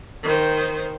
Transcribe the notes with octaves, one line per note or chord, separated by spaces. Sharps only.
D#3 C5